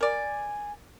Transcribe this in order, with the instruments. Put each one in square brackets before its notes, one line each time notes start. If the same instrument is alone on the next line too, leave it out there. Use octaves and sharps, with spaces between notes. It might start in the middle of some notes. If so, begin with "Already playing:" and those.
[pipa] A#4 D5 [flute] G#5